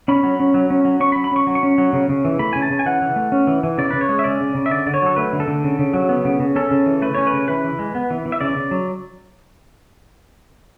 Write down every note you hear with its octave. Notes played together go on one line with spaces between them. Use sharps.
C#4 B5
F#3
C#4
F#3
C#4
F#3
C#4 C#6
B5
F#3
B5
C#4 C#6
F#3
C#6
C#4
F#3
C#3
C#3
E3
A3 B5
C#3 G#5
A5
C#3
G#5
E3 F#5
E3
A3
C#4
E3
E3
C#3 D5
C#3 B4
C#5
G#3
E5
C#4 D5
C#3
C#3
E5
D3 D5
D3 D5
C#5
F#3 A4
A3 B4
D3
A4
D3
C#3
C#3
F#3
B3
C#3
C#3
C#4 A4
C#3
E3
A3 B4
C#4 C#5
B4
C#3
E3 B4
E3
G#3
B3
E3
E3
E5
C#3 D5
C#3
F#3